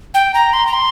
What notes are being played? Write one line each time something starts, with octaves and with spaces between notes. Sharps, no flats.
G5
A#5
C6
A#5
C6